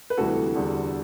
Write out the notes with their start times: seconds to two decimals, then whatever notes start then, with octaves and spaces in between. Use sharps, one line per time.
0.10 B4
0.17 D2 C3 E3 G3 F#4 A4
0.55 E2 D3 G3